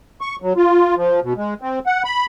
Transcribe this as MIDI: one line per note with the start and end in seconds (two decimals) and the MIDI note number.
0.21 0.36 85
0.42 0.53 54
0.57 0.95 65
0.96 1.20 53
1.22 1.33 47
1.37 1.54 56
1.61 1.79 60
1.86 2.03 78
2.04 2.26 83